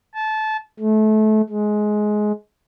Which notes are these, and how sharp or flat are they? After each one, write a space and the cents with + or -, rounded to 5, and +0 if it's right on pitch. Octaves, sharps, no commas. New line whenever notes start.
A5 -20
A3 -30
G#3 +15